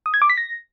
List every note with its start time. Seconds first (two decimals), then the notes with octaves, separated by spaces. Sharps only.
0.06 D#6
0.14 G#6
0.22 D6
0.30 B6
0.37 A#6